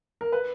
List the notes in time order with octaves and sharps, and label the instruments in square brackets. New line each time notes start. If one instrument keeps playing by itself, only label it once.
[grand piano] A#4
B4